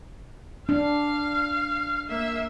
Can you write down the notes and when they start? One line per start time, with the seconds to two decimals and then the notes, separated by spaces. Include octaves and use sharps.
0.69 D4 F5
2.09 A#3 E5